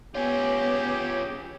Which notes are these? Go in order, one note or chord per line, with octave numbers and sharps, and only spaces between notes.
B3 F4 G4 G#4 C#5